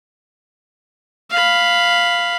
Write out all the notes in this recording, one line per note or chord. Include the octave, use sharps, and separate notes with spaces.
F5 B5